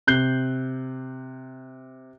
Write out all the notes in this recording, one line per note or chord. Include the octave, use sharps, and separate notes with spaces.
C3 F#6 G6 C7 G7